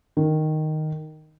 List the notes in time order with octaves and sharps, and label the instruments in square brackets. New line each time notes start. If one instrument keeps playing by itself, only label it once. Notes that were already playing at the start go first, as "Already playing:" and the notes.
[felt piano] D#3